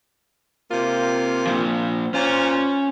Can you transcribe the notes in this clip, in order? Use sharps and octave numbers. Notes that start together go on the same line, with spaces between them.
C3 A#3 F4
A#2 F3
A#2 C#4 F4 C5